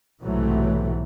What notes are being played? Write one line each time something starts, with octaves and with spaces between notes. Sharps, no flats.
B1 G#2 C3 E3 F#3 A3